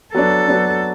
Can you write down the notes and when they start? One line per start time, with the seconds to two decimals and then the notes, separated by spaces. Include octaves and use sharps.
0.14 F#3 B3 D4 A4
0.48 F#3 B3 D4